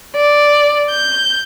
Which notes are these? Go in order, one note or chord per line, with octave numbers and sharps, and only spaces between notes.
D5
G6